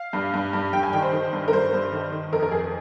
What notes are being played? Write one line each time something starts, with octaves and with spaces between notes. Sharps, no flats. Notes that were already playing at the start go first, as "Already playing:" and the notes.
Already playing: F5
G2
G2
G2
G2 G5
G#5
D#3 G5
C5
D#3
G2
A#4
G2 C5
G2
D#3
D#3
F2 A#4
A#4
F2 G#4